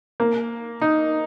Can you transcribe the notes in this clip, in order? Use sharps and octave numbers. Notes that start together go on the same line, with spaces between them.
A#3
D#4